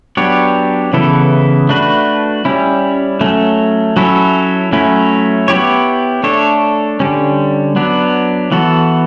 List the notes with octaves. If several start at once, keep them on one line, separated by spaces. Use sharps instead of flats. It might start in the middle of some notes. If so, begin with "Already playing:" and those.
F#3 B3 D4 G4 C#5
C#3 E3 B3 E4 A4
A3 D4 F#4 B4
G3 C#4 E4
F#3 A3 C#4
F#3 C#4 E4 A4
F#3 A3 C#4 E4
B3 E4 G4 C#5
A3 D4 A4 C#5
D3 G3 C#4
F#3 B3 D4
E3 B3 F#4 A4